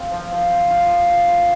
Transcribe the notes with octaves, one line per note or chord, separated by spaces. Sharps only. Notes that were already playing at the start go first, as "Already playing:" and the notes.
Already playing: C4 F4
F3
F3
C4
F4
F3
F3
C4